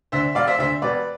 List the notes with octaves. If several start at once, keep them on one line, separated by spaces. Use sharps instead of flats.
D2 D3 C5 E5
E1 D5 F5
C5 E5
D2 D3 C5 E5
E1 B4 D5